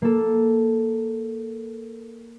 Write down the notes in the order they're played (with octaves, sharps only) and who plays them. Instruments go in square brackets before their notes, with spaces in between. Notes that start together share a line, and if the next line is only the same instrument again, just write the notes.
[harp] A#3 A4